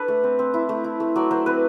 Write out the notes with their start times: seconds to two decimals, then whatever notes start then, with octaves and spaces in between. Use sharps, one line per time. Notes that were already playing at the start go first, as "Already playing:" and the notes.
Already playing: D4 A4 B4
0.08 A3
0.24 C4
0.39 C4
0.54 E4
0.69 A3
0.84 E4
1.00 A3
1.16 F#3 D5
1.31 F#3 C5
1.46 C4 B4